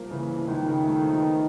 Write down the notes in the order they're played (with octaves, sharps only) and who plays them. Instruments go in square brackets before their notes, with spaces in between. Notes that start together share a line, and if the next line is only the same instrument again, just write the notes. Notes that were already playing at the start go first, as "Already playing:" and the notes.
Already playing: [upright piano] C2 F3 A#3
[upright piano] C#3 [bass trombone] E3
[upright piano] F3
[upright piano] C#2 [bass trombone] D#3
[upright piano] C#3
A3
F3
B3